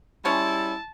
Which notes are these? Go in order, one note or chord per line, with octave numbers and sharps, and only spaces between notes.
G3 G#3 C#4 E4 G#4 A5